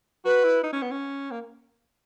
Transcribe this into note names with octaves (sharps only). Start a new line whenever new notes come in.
F#4 B4
E4
D#4
C#4
B3
C#4
A#3